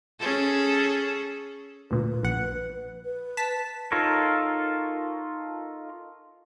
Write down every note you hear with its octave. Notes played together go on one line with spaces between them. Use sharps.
C#4 G#4 A4
D2 A#2 B4
A#1 F#5
B4
A5 B6
D#4 F4 A4 A#4 C#5